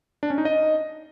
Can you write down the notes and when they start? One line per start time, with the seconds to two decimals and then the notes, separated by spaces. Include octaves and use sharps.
0.23 D4
0.30 C#4
0.38 D#4
0.45 D#5